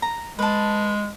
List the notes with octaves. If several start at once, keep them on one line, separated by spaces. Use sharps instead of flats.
A#5
G#3 B4 A5